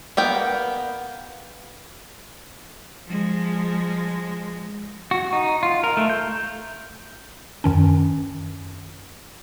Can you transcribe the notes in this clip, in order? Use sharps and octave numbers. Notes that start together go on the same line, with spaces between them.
A#3 B3 G5
F3 G#3
F#4
D#4
F4
A#4
A3
G6
F#2 D#3 C#4